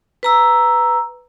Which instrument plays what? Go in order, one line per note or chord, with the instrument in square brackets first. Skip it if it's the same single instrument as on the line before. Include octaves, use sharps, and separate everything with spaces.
[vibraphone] B4 A#5 E6